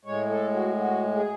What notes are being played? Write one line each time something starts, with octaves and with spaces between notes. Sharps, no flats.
A2 G#3 C#5
A4
F#4
F#4
G#4